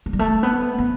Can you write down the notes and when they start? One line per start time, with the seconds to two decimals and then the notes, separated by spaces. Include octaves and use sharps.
0.06 A3
0.13 G3
0.19 A3
0.43 B3
0.78 B3